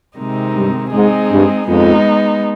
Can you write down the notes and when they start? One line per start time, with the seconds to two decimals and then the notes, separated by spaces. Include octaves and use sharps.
0.18 C3 D#3 G#3 C4 D#4
0.56 G2
0.93 G#2 G#3 C4 D#4 G#4
1.31 G2
1.68 F2 G#3 B3 D#4